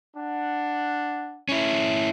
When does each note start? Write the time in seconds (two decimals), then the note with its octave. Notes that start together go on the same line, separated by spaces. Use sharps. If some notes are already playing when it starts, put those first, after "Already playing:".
0.16 D4 F#5
1.49 C#4 E4